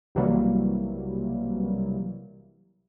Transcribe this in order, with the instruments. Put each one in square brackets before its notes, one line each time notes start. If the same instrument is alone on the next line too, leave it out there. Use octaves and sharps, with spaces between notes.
[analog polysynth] B1 C3 E3 F#3 G3 A#3